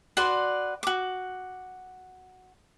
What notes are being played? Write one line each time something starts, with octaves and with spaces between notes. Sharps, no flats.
F#4 B4 D5 C6
F#4 D6